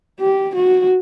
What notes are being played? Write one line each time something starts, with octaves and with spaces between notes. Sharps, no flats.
G4
F#4